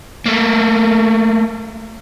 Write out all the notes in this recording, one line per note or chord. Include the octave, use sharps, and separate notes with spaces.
A3 A#3